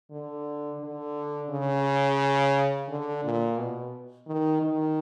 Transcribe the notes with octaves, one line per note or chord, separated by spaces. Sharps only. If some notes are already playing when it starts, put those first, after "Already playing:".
D3
D3
C#3
D3
A#2
B2
D#3
D#3